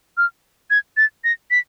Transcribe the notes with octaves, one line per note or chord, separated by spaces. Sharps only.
F6
G#6
A6
A#6
B6